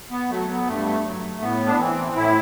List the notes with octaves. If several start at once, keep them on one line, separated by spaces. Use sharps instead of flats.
B3
F#3 A3
B3
G2 A3
F#3
A2 B3
D4
E3 C4
A2 E4